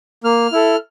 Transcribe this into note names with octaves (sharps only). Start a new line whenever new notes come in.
A#3 F6
E4 A4